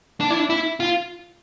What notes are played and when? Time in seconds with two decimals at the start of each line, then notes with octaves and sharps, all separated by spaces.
0.20 D4
0.30 E4
0.39 D4
0.50 E4
0.80 F4